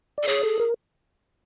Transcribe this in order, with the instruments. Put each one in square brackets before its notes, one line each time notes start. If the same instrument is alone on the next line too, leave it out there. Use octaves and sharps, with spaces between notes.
[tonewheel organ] D5
[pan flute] A4
[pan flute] G#4 [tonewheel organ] C#5
[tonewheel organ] A4
A#4